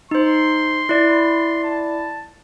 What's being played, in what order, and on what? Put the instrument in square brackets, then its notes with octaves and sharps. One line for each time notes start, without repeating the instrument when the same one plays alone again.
[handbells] D#4 C5 [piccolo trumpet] C6
[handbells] E4 D5
[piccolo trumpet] A5